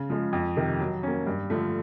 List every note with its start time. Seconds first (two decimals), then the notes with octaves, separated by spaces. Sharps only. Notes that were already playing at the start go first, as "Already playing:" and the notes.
Already playing: C#3
0.10 F3 G#3
0.33 F2
0.57 C3 D#3
0.80 F#3
1.03 A#3 C#4
1.27 G2
1.50 D3 F3 A3